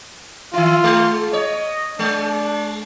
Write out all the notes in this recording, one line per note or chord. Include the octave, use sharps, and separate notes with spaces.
D#3 E4 F4
G#3
C#5 D#5
G#3 D4